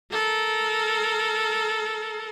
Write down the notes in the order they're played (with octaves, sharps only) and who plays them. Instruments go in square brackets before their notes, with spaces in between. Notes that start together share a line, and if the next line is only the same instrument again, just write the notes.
[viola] A4 A#4